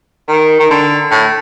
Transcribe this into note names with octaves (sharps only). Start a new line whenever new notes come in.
D#3
D#3
D3
A2